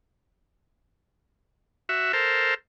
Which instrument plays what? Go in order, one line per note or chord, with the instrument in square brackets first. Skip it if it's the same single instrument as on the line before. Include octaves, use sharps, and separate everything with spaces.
[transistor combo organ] F#4 E5
A4 A#4 C5